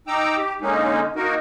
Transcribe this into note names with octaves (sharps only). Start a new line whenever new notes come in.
D#4 G5 A#5 D6 E6
G4
D3 G#3 A#3 C#4 D#4
A#3 D#4 F#4 A#4